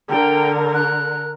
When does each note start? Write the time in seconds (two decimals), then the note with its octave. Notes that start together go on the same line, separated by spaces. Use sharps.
0.10 D3 A#4 G5
0.74 F#6